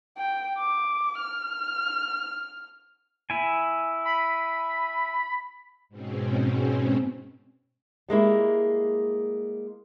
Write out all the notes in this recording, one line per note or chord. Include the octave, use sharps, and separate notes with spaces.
G5
D6
F6
E4 G#5
B5
G#2 B2 C4 C#4
G3 G#3 A#3 E4